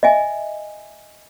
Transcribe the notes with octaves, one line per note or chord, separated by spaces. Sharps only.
D#5 E5 G#5